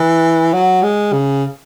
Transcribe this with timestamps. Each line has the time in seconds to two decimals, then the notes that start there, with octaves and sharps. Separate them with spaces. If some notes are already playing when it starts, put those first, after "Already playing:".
Already playing: E3
0.53 F#3
0.83 G#3
1.13 C#3